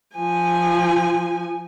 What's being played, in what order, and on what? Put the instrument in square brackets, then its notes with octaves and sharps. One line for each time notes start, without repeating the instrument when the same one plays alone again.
[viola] F3 G#5